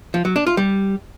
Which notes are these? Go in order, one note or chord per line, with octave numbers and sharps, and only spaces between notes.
F3
F#3
D4
F4
G3